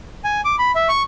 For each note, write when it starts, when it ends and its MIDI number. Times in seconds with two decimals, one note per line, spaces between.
0.24 0.41 80
0.45 0.56 86
0.59 0.71 83
0.75 0.88 76
0.89 1.02 85